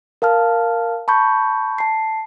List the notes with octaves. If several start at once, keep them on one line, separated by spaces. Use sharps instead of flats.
A#4 F5 A5 F6
A5 B5 C#6 G6
A5 C7